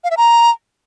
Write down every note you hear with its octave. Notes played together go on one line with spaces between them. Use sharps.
F5
E5
A#5